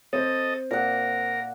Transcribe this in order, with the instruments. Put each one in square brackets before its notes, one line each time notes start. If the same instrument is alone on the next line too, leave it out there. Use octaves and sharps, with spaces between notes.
[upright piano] C4 [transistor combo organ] A4 D#5
[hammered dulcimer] A#2 F#5 [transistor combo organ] A#4